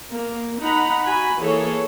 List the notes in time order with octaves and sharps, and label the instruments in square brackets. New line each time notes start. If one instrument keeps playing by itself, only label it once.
[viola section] A#3
D#4 F#5 A#5 B5
F#4 G#5 B5
E3 A#3 G#4 A4 C#5